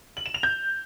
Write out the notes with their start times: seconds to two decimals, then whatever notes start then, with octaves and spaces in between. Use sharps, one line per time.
0.17 F#7
0.26 E7
0.34 F7
0.43 G6